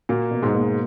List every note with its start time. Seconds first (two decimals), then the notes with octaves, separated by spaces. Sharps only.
0.09 A#2 A#3 F#4
0.31 B2
0.42 G#2 G#3
0.54 A#3